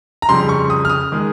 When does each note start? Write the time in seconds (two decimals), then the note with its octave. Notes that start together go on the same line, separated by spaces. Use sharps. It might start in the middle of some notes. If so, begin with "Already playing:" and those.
0.22 A#5
0.29 F2 C#3 G3 C6
0.49 C#6
0.70 D#6
0.85 F6
0.89 D#6
1.12 D#3 G#3